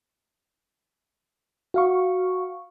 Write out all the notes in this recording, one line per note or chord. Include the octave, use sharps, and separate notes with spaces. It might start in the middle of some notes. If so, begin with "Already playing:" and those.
F#4 F5 C#6